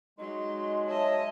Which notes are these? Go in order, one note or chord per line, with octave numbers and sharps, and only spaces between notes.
F#3 G#3 D#4 C6
C#5 D#5 E5 A5